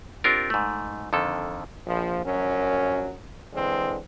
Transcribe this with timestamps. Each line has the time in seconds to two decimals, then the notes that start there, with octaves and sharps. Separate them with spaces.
0.24 C4 D4 F4 G4 A#4
0.50 G#2 A3
1.13 F2 D3 D#3 A4
1.86 A#1 F3
2.25 A#1 F#2 F#3 C#4
3.53 D3 E3 G#3 C4